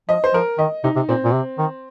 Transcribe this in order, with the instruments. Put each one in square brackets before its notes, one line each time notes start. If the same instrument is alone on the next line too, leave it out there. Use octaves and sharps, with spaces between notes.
[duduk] F3 [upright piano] D#5
[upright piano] C5
[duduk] F3 [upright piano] A#4
[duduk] D#3 [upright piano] D#5
[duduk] C3 [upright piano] D#4
[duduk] C3
[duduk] A#2 [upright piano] C4
[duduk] A#2
C3
D#3